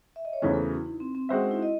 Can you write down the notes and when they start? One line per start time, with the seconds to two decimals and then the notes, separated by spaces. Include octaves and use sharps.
0.16 E5
0.25 D#5
0.33 C#5
0.42 E2 C#3 E3 A3 C#4 C5
0.54 A4
0.64 F#4
0.75 E4
0.86 D#4
1.00 C4
1.15 C4
1.29 G#3 C4 C#4 F#4 C5 E5
1.40 D#4
1.51 E4
1.63 D#5